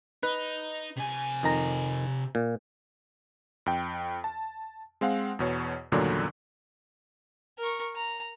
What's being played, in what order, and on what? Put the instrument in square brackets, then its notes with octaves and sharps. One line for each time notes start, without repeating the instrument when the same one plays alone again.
[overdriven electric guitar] D#4 [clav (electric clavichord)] B4
[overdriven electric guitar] C3 G#5
[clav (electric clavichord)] F2 D#3 A#5
A#2
[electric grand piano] F2 G5
A5
G#3 C4 F5 F#5
E2 B2 C#5
E2 G2 A#2 D3 D#3 F#3
[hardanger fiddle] A#4 C#6
A#5